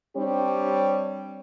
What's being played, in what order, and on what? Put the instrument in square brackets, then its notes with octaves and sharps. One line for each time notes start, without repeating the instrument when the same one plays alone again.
[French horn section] G3 C4 D4 G4 C#5